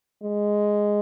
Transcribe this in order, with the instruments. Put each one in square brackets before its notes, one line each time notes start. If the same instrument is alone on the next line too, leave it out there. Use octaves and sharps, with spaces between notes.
[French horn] G#3